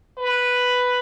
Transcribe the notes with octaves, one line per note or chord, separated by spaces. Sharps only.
B4